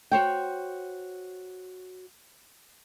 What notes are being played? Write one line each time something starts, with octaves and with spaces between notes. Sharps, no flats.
F#4 C5 C#5 G5